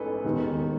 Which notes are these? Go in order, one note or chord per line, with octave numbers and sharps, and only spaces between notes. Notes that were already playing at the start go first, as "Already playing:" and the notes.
Already playing: A1 G#2 E3 A4 B4
E1 D#2 D#3